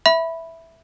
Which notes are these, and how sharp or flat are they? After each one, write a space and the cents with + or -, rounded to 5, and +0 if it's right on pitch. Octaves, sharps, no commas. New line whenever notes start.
E5 +0 B5 +0